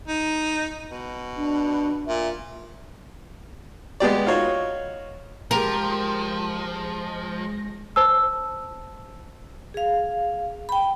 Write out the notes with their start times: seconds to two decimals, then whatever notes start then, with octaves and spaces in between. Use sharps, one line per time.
0.08 D#4
0.91 B2
1.37 D4
2.07 A#2 E5
4.00 G#3 B3 G4 D5
4.26 D#4 F4 F#4 C#5
5.51 F3 G#3 G4 A#4 G5 A#5 A#6
7.96 C5 A5 E6
9.74 G#4 F5
10.69 G5 B5